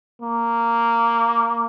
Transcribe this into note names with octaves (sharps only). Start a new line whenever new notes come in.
A#3